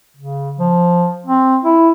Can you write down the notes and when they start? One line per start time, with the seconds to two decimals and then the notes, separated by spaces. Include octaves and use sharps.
0.17 C#3
0.59 F3
1.26 C4
1.64 E4